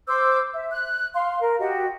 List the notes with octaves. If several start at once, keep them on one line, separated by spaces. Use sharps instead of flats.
C5 D6 E6 G6
E5
F#6
F5 C6
A#4
F#4 G4 D#5